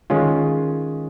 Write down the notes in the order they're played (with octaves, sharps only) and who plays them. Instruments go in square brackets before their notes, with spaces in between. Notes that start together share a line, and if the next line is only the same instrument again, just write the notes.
[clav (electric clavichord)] D#3 G#3 C#4 F4